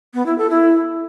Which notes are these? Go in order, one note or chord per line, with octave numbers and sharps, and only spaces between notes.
B3
E4
A4
E4